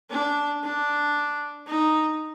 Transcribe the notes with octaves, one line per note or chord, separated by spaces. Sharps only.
D4
D4
D#4